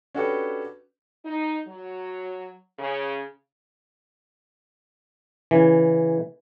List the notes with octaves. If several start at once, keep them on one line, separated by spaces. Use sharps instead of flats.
C#4 D4 F#4 G4 A4 B4
D#4
F#3
C#3
C#3 E3